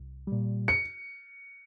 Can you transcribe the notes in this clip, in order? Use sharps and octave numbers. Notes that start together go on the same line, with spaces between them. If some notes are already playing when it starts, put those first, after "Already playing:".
Already playing: C2
A#2 G3
C#7